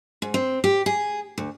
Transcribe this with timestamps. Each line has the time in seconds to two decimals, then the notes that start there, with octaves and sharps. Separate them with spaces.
0.22 G#2
0.34 C4
0.64 G4
0.86 G#4
1.38 D2